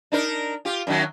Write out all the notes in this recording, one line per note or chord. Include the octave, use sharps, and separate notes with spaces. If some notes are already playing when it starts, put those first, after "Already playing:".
D4 D#4 A#4
F4 G4
F#2 D#3 F#3